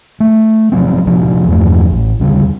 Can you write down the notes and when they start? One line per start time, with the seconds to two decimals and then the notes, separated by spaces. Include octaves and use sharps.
0.20 A3
0.72 C3 F3 F#3 C4
1.06 C#2 C3 F3 D4
1.47 E2 G2 F3 A3
1.90 A1
2.20 D2 C#3 G3